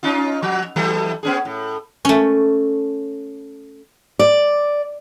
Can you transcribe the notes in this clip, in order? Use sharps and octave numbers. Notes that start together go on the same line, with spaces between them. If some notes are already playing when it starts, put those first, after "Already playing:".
C#4 D#4 F4
F3
E3 F#3 A3
B3 C#4 G#4
A2
A3 C#4
D5